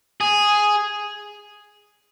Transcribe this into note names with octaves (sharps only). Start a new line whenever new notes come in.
G#4